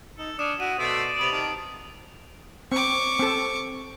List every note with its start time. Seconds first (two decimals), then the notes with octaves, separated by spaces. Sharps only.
0.18 D#4 A4
0.39 C#4 D4 D#6 E7
0.60 E4 F#4 D#7
0.79 B2 A3 C5 D5 E5
1.19 C3 B3 D#6 D7 F7
1.32 D#3 A5
2.72 C4 C#6 D6
3.19 C4 A4